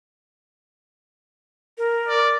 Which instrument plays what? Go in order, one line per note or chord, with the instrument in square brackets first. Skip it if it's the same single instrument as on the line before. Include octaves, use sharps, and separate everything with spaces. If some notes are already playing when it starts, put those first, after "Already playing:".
[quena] A#4
[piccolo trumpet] D5